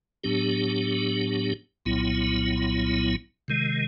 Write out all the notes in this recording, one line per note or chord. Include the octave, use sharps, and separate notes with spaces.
A2 F#3 B3 D4 G4
C2 A#2 F#3 B3 E4
C3 D#3 G#3